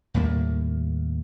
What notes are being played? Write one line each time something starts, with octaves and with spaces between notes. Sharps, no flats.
D#2 A2 G3 A#3